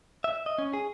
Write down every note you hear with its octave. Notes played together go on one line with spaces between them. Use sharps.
E5
D#5
C#4
G#4